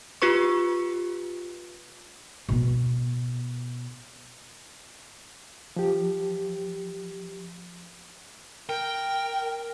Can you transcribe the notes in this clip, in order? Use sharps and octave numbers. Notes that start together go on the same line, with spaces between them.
F4 G4 B4 C#6
B2 B3
F3 G4
A#4 G5